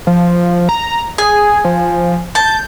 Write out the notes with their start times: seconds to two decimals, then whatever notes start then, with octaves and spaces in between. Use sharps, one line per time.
0.07 F3
0.69 A#5
1.18 G#4 G#5
1.65 F3
2.35 A5 G6